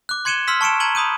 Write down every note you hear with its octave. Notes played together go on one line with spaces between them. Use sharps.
D6 F#6
C6 G#6 C#7 D#7 E7 G7
C6 E6 F6 B6
A5 C#6 C#7 D7 E7
A#5 G#6 D#7 F#7 G7
B5 D#6 G6 D#7